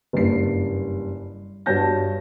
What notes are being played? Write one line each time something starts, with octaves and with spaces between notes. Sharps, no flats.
F#1 G2 G3 C7
G2 F#4 C#5 A5 G6 A#6